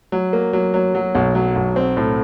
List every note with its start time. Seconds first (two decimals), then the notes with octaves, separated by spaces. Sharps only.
0.12 F#3
0.33 A#3
0.53 F#3
0.74 F#3
0.95 F#3
1.15 B1
1.35 F#3
1.56 B1
1.76 C4
1.97 A2